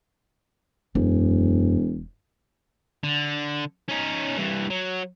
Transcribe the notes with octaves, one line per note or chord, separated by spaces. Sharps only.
E1 F#2
D3
C#4 D#4
G2 E3
F#3